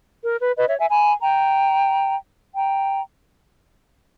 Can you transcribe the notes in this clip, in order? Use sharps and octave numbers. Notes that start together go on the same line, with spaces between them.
A#4
B4
B4 D#5
C#5 E5
E5 G#5
G#5 B5
G5 A#5
G5 A#5